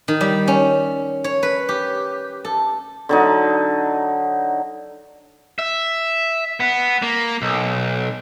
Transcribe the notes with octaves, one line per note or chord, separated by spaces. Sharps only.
D#3
G3
C#4
C#5
B4
G4
A4
D3 F#3 D#4
E5
B3
A#3
B1